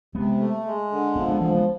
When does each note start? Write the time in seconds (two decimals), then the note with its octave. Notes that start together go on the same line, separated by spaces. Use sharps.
0.15 C3 G#3 B3
0.40 A3
0.66 G#3
0.91 D3
1.16 F3 B3 D4
1.28 G#3 B3
1.41 E3 F3 G#3
1.54 G#3 B3